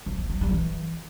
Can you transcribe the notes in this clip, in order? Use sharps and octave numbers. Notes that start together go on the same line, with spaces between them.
F3
A#3
F#3
G3
E3